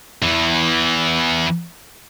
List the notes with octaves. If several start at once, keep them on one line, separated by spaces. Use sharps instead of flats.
E2 E3